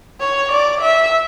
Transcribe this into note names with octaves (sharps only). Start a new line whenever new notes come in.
C#5
D5
E5